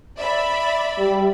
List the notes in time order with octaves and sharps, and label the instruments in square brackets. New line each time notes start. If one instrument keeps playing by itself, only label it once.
[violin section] D5 E5 B5
[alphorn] G3